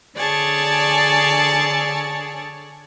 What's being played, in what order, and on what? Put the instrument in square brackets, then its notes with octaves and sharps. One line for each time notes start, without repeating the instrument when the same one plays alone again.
[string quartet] D3 G#4 C#5 D5 A5